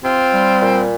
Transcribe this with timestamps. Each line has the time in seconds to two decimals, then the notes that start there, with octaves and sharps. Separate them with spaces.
0.04 C4 F4
0.33 G3
0.62 A#2